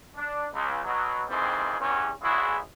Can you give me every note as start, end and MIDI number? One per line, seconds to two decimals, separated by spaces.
0.17 0.46 62
0.52 0.81 37
0.85 1.24 47
0.85 1.24 54
1.29 1.76 41
1.29 1.76 51
1.29 1.76 52
1.29 1.76 55
1.29 1.76 60
1.29 1.76 68
1.80 2.10 40
1.80 2.10 43
1.80 2.10 61
2.23 2.57 33
2.23 2.57 40
2.23 2.57 64
2.23 2.57 66
2.23 2.57 68